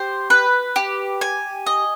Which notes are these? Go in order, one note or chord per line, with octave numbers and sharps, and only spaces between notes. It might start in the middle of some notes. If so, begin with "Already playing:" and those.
Already playing: G4 C5
B4
G4
G#5
D#5